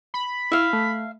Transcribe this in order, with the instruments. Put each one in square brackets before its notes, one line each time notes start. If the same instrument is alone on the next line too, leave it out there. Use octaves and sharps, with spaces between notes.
[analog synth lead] B5
[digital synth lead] E4 [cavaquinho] E5 F5
[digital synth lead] A3